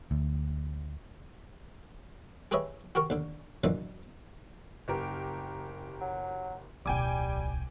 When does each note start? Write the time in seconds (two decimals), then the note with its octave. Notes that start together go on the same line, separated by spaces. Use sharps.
0.11 D2
2.51 G4 G#4 B4 C#5 D#5 E5
2.95 F#4 G4 A#4 C#6
3.10 D#2 D3
3.64 F#2 A#2 D3 E3 D#4
4.88 F#1 G4 A#4
6.01 F#3
6.86 D1 B1 G3 G5 G#5 D6